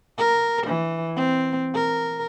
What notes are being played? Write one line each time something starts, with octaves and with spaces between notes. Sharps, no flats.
A#4
E3
C4
A#4